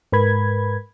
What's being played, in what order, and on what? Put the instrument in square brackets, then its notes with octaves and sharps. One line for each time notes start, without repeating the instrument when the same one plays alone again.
[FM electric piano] G#2 A#4 B4 B5 G#6